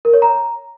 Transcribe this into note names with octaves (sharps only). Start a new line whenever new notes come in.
A#4
C#5
A#5